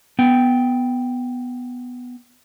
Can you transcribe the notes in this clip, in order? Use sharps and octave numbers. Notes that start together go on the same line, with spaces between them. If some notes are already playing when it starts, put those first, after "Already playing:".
B3 G5